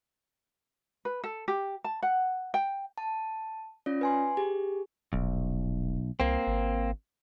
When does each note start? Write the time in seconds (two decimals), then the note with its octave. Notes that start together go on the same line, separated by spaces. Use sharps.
1.05 B4
1.24 A4
1.48 G4
1.84 A5
2.02 F#5
2.54 G5
2.98 A5
3.86 C#4 F4 D5
4.01 B4 G#5 C6
4.37 G4 G#4
5.13 D#1 B1
6.20 C2 A#3 C4
6.47 G#1